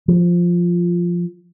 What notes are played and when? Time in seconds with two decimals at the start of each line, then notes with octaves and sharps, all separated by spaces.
0.08 F3